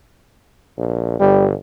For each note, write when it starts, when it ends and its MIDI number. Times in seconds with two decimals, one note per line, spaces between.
0.77 1.17 34
1.20 1.53 31
1.20 1.46 55